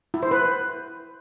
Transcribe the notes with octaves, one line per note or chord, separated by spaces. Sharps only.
E4
C5
B4